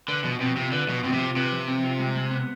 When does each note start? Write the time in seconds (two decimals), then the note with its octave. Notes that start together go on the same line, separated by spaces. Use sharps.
0.08 D3 B4
0.24 B2 F3
0.41 B2 C4
0.56 C3 F4
0.72 D3 B4
0.88 B2 F3
1.04 B2 C4
1.13 C3
1.20 F4
1.37 C3 B4
1.52 F3
1.68 C4
1.84 F4
1.99 G#3
2.16 G#3
2.31 B3